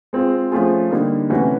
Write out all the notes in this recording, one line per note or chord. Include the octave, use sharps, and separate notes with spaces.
G#3 C4 F4
F3 A3 C#4 F4 G#4
D3 G3 A#3 D#4
C3 E3 A3 C#4 F#4